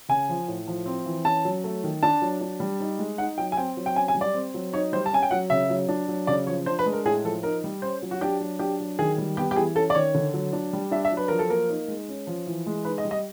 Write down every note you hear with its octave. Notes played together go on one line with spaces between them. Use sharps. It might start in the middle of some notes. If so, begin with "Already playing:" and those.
C#3 G#5
F3
A2
F3
C4
E3
C#4 A5
F#3
A3
D#3
D4 A5
F#3
D4
G3
D#4
G#3
D#4 F#5
F#3 G5
G#5
C4 G5
F#3
G5
C#4 G#5
G#5
G3
D5
C4
F#3
D#4 C#5
G3 C5
A5
C#4 G#5
G5
F#3 F#5
C#3 E5
F#3
D4
F#3
C#3 D5
F3 C#5
D4 C5
B4
G#3
A#4
A2 G#4
F3 A4
D#4 A#4
G3
C#4 C5
F#3
F#4
D4 G4
F#3
D4 G4
F#3
D#3 G#4
G3
B3 G4
G4
E3 G#4
C#4 A4
D5
D#3 C#5
D3
F#3
D4
G3
D4 E5
E5
F#3
B4
F3 A#4
A4
A#3 A#4
D#4
G#3
C#4
F3
E3
G#3
D#4 B4
D#5
G3
D#5